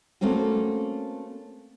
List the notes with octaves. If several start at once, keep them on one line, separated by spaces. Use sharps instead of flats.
A3 A#3 C4 C#4 F#4